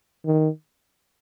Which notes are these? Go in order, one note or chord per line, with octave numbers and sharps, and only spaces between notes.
D#3